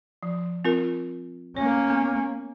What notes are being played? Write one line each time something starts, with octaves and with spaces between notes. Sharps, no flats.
F3
C4 F4 A#4
A#3 C#4 C#5
B3